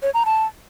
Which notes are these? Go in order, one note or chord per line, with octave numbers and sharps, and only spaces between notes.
C#5
A#5
A5